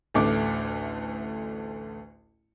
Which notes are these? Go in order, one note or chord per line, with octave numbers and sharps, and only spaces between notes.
A1 D2 A3 D6